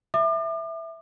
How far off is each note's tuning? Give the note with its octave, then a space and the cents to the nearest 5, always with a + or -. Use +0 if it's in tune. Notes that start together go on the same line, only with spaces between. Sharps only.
E5 +0 D6 +40